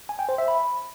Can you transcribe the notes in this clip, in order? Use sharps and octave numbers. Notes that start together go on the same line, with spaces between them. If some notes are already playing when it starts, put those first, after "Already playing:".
G#5
G5
C5
E5
B5